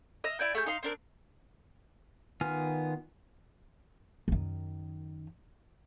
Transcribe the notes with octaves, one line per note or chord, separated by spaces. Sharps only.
D#5 E5 F6
E4 D5 G#5 G6
A3 G#4 G6
D#4 F5 C6
C4 D4 A#4
D#3 B3 F4 G#5 F6
F#2 D#3